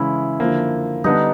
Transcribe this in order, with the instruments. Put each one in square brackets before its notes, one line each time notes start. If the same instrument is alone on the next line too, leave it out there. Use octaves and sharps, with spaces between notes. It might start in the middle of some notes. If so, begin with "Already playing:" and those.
Already playing: [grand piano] C#3 E3 G#3 C#4 [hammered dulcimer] E4
[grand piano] D3 F3 A#3
[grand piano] D3 G3 B3 D4 [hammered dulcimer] D#4